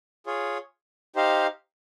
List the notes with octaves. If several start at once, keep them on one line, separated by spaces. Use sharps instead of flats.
F4 G#4 C#5
D#4 G4 C5 F5